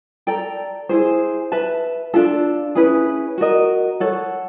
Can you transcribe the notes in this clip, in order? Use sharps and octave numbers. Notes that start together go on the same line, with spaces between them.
A4 D5 G5 A#5
E4 G#4 C5
B4 E5 A5
D4 F4 A4
C#4 E4 G#4 B4
F#4 A#4 D#5
A4 C#5 F#5